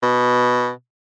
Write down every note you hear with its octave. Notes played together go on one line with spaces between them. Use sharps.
B2